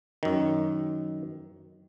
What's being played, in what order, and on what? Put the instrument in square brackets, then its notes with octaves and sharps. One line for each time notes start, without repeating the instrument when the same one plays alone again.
[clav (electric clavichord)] F#2 D#3